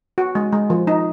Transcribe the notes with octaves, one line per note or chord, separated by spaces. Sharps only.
F#4
G#3
G#3
F3
D#4